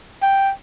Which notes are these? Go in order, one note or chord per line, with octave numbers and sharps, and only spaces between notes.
G5